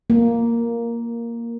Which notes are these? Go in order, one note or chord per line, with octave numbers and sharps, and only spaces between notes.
A#3